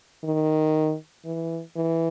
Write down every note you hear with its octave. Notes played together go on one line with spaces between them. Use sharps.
D#3
E3
E3